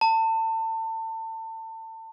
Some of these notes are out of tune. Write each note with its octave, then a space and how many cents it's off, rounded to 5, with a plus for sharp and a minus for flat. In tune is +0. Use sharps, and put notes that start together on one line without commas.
A5 +30